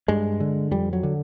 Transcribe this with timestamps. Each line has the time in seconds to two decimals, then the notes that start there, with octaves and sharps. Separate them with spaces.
0.08 G2 G#3
0.40 D3
0.71 F2 G3
0.93 F#3
1.03 D3